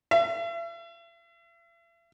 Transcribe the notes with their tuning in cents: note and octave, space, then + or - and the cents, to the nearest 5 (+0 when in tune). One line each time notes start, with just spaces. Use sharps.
E5 +40